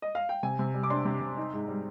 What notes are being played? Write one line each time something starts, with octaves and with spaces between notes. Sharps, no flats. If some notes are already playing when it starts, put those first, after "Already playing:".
D#5
F5
G5
C3 G#5
C3
G3
D6
D4 C6
C3
C3
D#4
G#2
G3